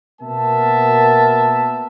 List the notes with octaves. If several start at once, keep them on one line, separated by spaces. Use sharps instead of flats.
B2 A#3 B3 A#4 E5 A5